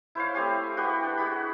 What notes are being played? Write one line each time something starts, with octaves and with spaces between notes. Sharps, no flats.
E4 C5 C#5 F5
A3 C4 G4 G#5
F#4 G4 B4
D4
F#4 G#4 B5